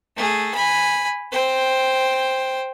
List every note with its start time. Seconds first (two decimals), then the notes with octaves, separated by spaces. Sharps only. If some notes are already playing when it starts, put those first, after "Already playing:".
0.17 A3 G#4
0.54 G#5 B5
1.32 C5 G5